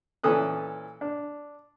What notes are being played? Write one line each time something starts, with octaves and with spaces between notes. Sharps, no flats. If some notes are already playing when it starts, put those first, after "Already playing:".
A#2 E3 C#4 A4 D#6 F#6
D4